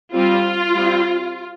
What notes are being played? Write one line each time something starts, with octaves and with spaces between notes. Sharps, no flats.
G3 C4 F4
G3 C4